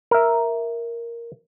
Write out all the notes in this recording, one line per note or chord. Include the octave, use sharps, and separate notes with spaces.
A#4 E5